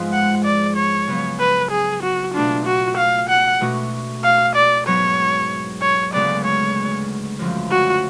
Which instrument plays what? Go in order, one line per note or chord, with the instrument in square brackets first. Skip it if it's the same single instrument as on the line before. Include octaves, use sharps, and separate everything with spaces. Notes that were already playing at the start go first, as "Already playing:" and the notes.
Already playing: [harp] G#2 F3 G#3 B3 F4
[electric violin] F#5
D5
C#5
[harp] C#3 F#3 B3
[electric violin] B4
G#4
F#4
[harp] B2 A3 F4 [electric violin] D4
[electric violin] F#4
F5
F#5
[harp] B2 A3 D4 F#4
[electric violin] F5
D5
[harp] G#2 F#3 B3 [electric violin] C#5
[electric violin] C#5
[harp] D2 C#3 G#3 B3 [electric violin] D5
[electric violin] C#5
[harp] F#2 D3 F3 A3
[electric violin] F#4